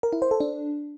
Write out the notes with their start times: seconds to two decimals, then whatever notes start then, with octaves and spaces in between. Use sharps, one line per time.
0.03 A#4
0.13 E4
0.22 C5
0.31 A4
0.40 D4